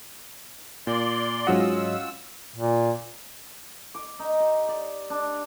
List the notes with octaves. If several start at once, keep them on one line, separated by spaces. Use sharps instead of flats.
A#2 D5 C6
G#2 F#3 C#4 F4 D#5 F#5 E6
A#2
D6
D#4
G4
D5
D4